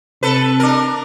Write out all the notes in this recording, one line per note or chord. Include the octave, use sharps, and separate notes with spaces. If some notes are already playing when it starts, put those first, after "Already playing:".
C3 A4 B4
D4 A#4